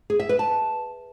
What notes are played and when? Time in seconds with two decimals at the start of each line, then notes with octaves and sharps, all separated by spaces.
0.10 G#4
0.20 E5
0.29 B4
0.39 A5